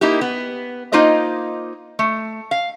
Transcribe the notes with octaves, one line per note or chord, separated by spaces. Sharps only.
A#3 D#4 E4 G4
B3
A#3 D#4 F4 C5 D#5
A3
F5